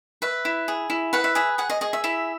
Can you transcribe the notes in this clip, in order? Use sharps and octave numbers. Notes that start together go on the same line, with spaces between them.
B4 E5
E4
G#4
E4
B4 F#5
E5
G#4 E5
G#4 F#5
D#5
G#4 D#5
E5
E4 E5